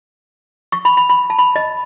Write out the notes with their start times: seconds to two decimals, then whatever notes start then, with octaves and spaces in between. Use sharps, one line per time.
0.72 C#6
0.85 B5
0.97 B5
1.10 B5
1.30 A5
1.39 B5
1.56 D#5